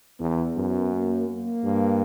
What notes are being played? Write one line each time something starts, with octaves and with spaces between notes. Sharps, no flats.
E2 B3
F#2
A#3
A#3
G2